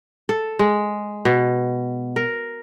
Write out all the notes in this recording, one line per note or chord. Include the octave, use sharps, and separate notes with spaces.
A4
G#3
B2
A#4